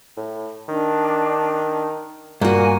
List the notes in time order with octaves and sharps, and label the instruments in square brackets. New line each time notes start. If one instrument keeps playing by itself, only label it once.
[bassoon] A2
[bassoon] D#3 [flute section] D4
[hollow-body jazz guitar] G2 [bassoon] A#2 [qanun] A#3 F#4 [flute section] G#5